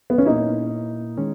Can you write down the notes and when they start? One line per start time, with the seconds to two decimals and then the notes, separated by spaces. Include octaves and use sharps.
0.10 B3
0.18 C#4
0.26 A#2 A#3 D#4 E4
1.18 D#3 G#3 C#4